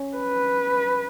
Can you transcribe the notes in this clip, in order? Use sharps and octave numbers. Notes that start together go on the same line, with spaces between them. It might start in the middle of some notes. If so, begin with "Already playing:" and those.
Already playing: C#4
B4